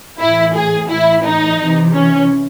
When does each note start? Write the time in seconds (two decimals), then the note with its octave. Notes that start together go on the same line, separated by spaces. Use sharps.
0.20 A2 E3 E4
0.55 G#4
0.89 A2 E3 E4
1.24 D#4
1.59 C3 E3
1.93 C#4